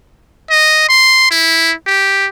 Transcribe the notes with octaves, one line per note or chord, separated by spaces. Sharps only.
D#5
C6
E4
G4